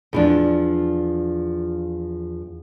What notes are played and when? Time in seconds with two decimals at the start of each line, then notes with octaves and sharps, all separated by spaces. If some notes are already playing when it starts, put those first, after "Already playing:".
0.13 E2 F3 D4